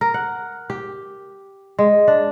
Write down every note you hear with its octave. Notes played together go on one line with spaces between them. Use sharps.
A#4
F#5
G4
G#3
D4